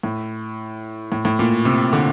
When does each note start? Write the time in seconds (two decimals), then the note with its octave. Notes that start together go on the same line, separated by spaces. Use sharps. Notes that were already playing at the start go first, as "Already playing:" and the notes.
0.03 A2
1.12 A2
1.25 A2
1.39 A#2
1.65 C3
1.93 D3